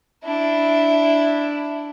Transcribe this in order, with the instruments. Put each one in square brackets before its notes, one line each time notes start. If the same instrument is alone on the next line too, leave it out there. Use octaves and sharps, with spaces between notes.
[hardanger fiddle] D4 E4